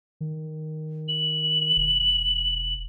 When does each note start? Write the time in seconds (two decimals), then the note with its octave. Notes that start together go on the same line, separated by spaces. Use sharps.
0.21 D#3
1.08 F#7
1.77 E1